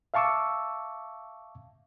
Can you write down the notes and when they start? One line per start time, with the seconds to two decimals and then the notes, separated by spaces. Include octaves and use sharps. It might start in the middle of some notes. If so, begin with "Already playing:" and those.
0.14 E5 F5 A5 C#6 D6 E6